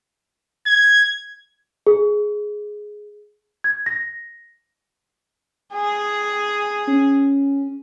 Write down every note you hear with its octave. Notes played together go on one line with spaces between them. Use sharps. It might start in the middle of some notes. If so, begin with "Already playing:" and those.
G#6
G#4
G#6
A#6
G#4
C#4